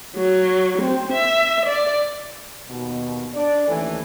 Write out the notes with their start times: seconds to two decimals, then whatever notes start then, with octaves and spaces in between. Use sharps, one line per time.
0.16 F#3
0.82 C4
1.12 E5
1.66 D5
2.69 D#2 B2
3.35 D4 D5
3.67 D#2 E3 A3 C#4 A4 G#5